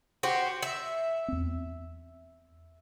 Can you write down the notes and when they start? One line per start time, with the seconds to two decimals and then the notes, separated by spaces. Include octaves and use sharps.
0.23 F#4 G4 C5
0.62 E5
1.28 E2 C4